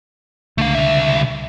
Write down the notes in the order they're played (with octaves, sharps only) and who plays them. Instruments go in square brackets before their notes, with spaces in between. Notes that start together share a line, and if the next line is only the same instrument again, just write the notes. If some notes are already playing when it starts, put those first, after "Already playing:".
[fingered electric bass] C#2 D3 [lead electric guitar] A3 F5
[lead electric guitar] C2 E5